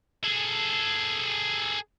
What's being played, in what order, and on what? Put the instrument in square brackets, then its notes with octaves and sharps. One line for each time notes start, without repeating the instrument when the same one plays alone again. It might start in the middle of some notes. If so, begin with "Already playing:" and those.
[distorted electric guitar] G#4 A4